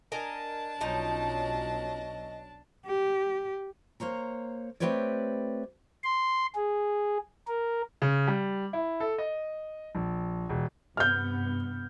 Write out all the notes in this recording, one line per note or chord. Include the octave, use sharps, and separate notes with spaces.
D4 A#4 D#5 G#5 A5
B1 F3 F#3 C#4 D#4 D#5
G4
A#3 C5 C#5 A#5
A3 C4 G4 B4 C#5 D5
C6
G#4
A#4
C#3
G3
E4
A4
D#5
A#1
E1
G2 C3 B3 F6 G6